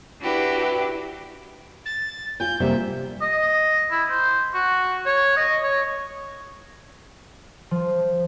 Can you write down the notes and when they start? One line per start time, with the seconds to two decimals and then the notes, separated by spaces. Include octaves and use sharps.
0.20 D4 E4 F#4 G4 B4
1.86 A6
2.40 F4 G#5 G6
2.60 C3 G3 A#3 E5
3.22 D#5
3.91 E4
4.10 C5
4.54 F#4
5.06 C#5
5.37 D#5
5.63 C#5
7.71 F3